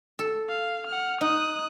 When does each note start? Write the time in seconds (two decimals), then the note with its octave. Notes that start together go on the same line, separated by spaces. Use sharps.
0.19 A4
0.49 F5
0.87 F#5 F6
1.21 D#4 D#6 F#6